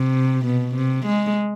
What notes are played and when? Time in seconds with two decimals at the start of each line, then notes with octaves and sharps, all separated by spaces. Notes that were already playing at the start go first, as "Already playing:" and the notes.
Already playing: C3
0.45 B2
0.75 C3
1.06 G#3